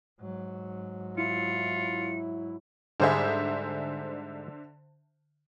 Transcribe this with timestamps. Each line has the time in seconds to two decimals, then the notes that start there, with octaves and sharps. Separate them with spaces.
0.20 G#2 F#3
1.18 E4 F4 C#7
3.00 G#2 D3 G3 G#3 C5 E5